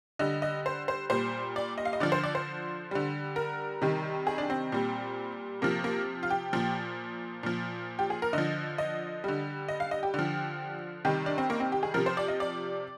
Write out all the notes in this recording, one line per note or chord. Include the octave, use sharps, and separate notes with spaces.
D3 G3 D#5
D#5
C5
C5
A#2 G3 C5
D5
D#5
F5
D#5
D3 F3 D5
C5
D5
C5
D3 G3
A#4
C3 D#3 G3
G#4
D4
C4
A#2 G3
C3 F3 A#3
A#3
F4
G4
A#2 F3
A#2 F3
G4
G#4
A#4
D3 F3 D#5
D#5
D3 G3
D#5
F5
D#5
G4
D3 F3
C3 D#3 G3 G4
D4
C4
A#3
C4
G4
G#4
C3 F3 A#4
C5
D5
D#5
D5